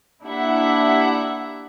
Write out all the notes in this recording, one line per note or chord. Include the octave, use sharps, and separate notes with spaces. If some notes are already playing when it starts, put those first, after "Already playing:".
A#3 D4 E4 G4 E5 F#5